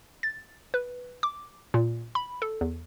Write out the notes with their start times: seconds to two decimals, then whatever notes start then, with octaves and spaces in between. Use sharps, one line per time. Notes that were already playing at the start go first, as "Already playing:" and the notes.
0.23 A6
0.74 B4
1.23 D6
1.74 A#2
2.15 B5
2.42 A4
2.61 E2